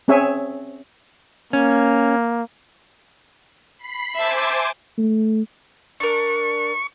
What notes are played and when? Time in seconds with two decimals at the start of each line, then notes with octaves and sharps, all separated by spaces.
0.08 C4 C#4 G#4 C#5 E5 G#5
1.53 A#3 C#4
3.79 B5 C7
4.17 C5 E5 G#5 A5 D6
4.98 A3
6.00 D4 A#4 C#6